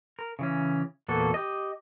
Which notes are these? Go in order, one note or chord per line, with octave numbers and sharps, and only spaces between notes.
A#4
C#3 E3 C#4
E2 A#2 A#3 F#4 A4
G4 D#5